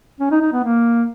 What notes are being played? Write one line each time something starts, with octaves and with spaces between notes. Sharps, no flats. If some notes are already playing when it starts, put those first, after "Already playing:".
C#4
D#4
D#4
B3
A#3